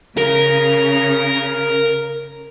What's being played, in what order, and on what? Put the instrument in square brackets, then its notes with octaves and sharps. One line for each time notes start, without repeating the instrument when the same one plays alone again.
[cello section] C#3 [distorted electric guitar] A#4